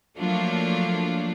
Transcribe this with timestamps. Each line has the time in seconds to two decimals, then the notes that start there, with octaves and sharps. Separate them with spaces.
0.17 F3 F#3 A3 A#3 D4 F4